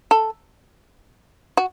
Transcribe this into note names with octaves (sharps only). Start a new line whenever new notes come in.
A4
F#4